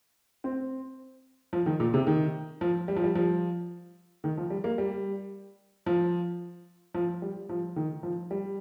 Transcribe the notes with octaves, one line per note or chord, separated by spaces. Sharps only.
C4
F3
D#3
A#2
C3
D#3
F3
G3
F3
G3
F3
D#3
F3
G3
A#3
G3
F3
F3
G3
F3
D#3
F3
G3